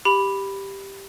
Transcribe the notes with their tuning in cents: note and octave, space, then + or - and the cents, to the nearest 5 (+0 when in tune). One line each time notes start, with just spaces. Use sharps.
G4 +0 B5 +0